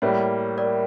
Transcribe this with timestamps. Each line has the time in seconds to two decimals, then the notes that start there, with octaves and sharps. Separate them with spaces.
0.02 A2 G3 A#3 C#5
0.58 A#4 D5